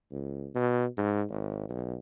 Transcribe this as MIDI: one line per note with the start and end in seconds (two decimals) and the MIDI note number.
0.11 0.48 37
0.55 0.85 47
0.97 1.24 44
1.30 1.67 32
1.69 1.97 35